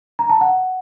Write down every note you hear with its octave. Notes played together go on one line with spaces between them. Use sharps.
A#5
A5
F#5